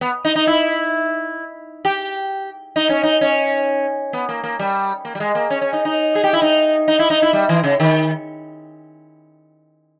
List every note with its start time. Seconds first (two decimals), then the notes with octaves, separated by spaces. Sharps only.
0.01 B3
0.25 D#4
0.35 D#4
0.47 E4
1.85 G4
2.76 D#4
2.89 C#4
3.03 D#4
3.21 C#4
4.13 B3
4.29 A#3
4.44 A#3
4.59 G3
5.05 A#3
5.15 G3
5.20 G#3
5.35 A#3
5.50 C#4
5.62 C#4
5.73 D#4
5.85 D#4
6.15 G#4
6.24 G4
6.33 E4
6.42 D#4
6.88 D#4
6.99 E4
7.10 D#4
7.22 E4
7.33 G3
7.49 E3
7.64 C#3
7.80 D#3